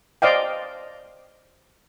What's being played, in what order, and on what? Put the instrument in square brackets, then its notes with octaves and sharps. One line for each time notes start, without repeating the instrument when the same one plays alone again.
[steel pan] C5 D5 D#5 F5 G5